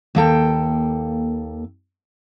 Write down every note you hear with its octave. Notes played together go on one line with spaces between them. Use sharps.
D#2 A#3 A4 G5